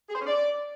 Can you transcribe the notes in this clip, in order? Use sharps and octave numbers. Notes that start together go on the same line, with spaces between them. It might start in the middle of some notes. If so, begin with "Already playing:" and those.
G#4
C5
C#4
D5